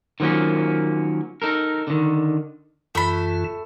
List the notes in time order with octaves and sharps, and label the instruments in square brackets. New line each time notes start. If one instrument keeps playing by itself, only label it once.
[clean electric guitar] D#3 F3 F#3 A#3 C#4
D#4 A4 A#4
D3 D#3
[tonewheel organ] F#2 E3 F4 [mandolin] A3 B5